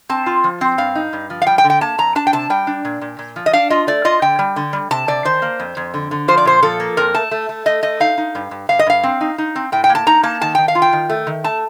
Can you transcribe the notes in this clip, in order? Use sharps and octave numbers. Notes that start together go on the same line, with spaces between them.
C4 A5
F4
F3
C4
G2 F5
D#4
G2
F3
F5
G3 G5
G5
D3
G5
A#3 A5
F2 A#5
D4 A5
G5
C3 A5
G3 G5
D4
A#2
A#2
A#2
F3
D#5
D4 F5
F4 D#5
A3 D5
F4 D#5
D3 G5
G3
D3
G3
C3 A5
C3 D5
D#3 C5
A#3
F2
F2
D3
D3
F3 C5
D5
A#2 C5
F3 A4
A#3
F2 A#4
A3 A5
A3
A3
A3 D#5
A3 D#5
D#4 F5
D#4
G2
G2
G2 F5
D#5
G2 F5
C4
D#4
D#4
C4
A2 G5
G5
A#3
A5
D#4 A#5
A#3 A5
D#3 A5
D#3 G5
F5
F4
G5
D#3
A3
D#3
A3 A5